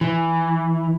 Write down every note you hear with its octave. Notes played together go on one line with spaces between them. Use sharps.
E3